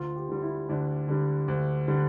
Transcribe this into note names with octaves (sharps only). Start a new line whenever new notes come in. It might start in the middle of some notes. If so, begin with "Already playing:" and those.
Already playing: D2 F4
G4
D3 G3
E4
D2 D4
D3 G3
D2
D3 G3